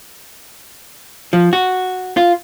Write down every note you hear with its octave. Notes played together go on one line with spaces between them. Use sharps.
F3
F#4
F4